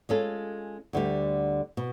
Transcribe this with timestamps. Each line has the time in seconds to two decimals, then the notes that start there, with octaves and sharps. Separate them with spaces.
0.09 G#3 C#4 F4 A4
0.93 D2 D3 G3
1.77 B2